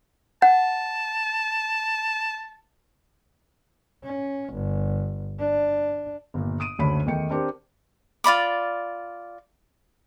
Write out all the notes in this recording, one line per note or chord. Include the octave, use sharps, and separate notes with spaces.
F#5 A5
C#4
G1
D4
G1 A#2
D#6 D7 D#7
F#1 D2 D3 A3 C#5 B5
E2 D#3 A3 G5 C#7
C4 D4 G4 A#4 C5
F4 D5 B5 D6